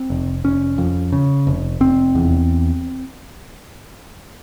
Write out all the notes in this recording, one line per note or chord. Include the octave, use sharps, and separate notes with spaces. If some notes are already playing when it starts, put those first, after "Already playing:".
Already playing: C4
F1
F1 C#4
F2
C#3
F1
F1 C4
E2